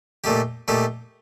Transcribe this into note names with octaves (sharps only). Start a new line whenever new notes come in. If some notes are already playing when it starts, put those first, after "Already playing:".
A#2 A3 D#4 G4
A#2 A3 D#4 G4